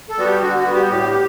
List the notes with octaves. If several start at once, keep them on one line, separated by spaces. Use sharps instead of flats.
A4
G3 B3 F#4
G4
D3 F#4
F#4
G3 B3
G4
F#4
A2 G4